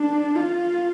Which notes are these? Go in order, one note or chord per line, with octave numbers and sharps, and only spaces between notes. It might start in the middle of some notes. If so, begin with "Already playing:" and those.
Already playing: D4
F4